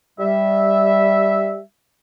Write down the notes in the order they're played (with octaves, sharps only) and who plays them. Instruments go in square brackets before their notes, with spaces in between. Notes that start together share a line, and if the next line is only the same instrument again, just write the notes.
[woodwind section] G3 E5